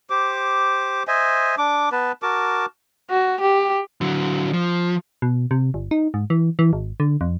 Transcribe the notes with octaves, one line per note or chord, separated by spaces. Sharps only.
G4 C5 D6
C5 D#5 E5 G#5
D4 D6
B3 B4 A5
F#4 A#4 A5 D6
F#4
G4
D3 F#3
F3
B2
C3
G1
D#4
G#2
E3
E3
G#1
D3
F2